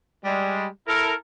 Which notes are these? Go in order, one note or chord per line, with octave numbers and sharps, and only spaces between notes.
G3 G#3
E4 A4 A#4